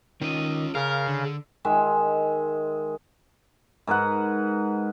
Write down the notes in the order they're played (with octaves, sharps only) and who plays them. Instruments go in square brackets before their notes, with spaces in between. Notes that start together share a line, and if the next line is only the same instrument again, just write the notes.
[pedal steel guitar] D#3 D#5 [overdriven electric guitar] C#4 F4
[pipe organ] C#3 [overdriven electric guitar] A#4 [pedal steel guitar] F5
[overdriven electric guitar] D3
[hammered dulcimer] D#3 G#3 E5
G#2 A#4 B4 F#5